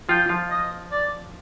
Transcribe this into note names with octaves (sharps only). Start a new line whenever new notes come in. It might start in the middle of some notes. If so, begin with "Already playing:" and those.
F3 F4 G5
F3 F4
D#5
D5